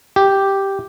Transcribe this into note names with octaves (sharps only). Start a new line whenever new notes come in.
G4